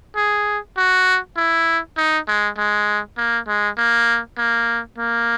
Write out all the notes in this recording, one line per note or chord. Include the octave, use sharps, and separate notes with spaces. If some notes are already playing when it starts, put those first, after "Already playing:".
G#4
F#4
E4
D#4
G#3
G#3
A#3
G#3
A#3
A#3
A#3